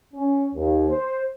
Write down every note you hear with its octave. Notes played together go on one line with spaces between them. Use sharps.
C#4
D#2
C5